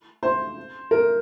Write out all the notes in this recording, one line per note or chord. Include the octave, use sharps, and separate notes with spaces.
C5
A#4